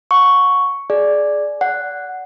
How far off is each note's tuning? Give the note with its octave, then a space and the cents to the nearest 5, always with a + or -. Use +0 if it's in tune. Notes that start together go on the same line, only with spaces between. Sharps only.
F#5 -35 C#6 +5
G#4 +15 D5 +0
D5 -30 F#5 +0